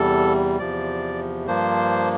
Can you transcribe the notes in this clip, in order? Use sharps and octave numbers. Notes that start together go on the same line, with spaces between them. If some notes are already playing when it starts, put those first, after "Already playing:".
Already playing: E2 C3 G3 A4
E2 C3 F3 D5
G2 F3 A#3 D4 C5